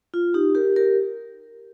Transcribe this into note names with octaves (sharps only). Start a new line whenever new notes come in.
F4
D#4 G4
G4 A#4
G4 A#4